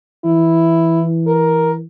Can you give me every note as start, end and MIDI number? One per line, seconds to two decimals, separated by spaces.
0.25 1.85 52
0.25 1.04 64
1.27 1.72 70